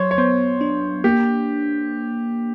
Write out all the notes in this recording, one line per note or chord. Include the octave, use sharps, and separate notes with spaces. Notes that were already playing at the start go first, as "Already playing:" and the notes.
Already playing: F#3 C5 C#5
C#5
B3 C5
D4
A#3 G4